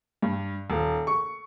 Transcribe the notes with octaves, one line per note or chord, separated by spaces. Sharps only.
G2
D#1
C#6